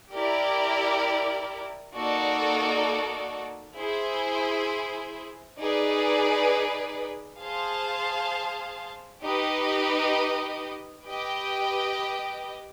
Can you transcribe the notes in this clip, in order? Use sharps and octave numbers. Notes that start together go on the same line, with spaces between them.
E4 G4 A#4 D5
A#3 D#4 F#4 A4 D5
E4 G#4 C5
D#4 G#4 B4 D5
G#4 C5 F5 A5
D#4 G4 B4 D#5
G4 B4 D#5 G5